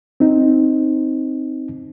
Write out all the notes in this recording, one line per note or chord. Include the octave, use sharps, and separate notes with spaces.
C4 D#4